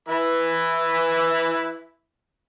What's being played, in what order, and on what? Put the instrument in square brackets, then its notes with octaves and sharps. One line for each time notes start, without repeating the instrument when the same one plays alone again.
[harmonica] E3 E4 B4